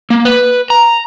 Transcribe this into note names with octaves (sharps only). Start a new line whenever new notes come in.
A#3
B4
A#5